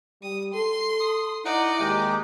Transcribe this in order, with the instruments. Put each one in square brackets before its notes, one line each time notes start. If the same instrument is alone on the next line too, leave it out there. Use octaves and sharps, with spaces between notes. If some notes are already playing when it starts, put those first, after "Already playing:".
[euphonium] G3 [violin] D#6
[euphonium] A4 [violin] C6
[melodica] D#6
[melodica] D#4 F#5 [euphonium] E4 [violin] D5 D#5
[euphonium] D#2 [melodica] G#3 D#4 G4